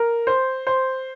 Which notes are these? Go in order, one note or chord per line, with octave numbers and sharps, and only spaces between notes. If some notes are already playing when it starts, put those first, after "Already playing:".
Already playing: A#4
C5
C5